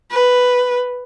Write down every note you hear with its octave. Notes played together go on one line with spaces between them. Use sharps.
B4